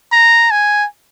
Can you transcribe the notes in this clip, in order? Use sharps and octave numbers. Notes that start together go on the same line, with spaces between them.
A#5
G#5